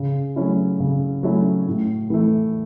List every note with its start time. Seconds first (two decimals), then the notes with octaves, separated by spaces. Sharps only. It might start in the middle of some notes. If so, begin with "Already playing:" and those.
Already playing: C#3
0.36 F#3 A3 C#4 E4
0.80 C#3
1.23 F#3 A3 C#4 E4
1.67 A2
2.10 E3 A3